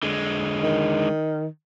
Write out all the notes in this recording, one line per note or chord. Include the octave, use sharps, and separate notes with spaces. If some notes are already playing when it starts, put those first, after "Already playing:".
D3 G#3
D#3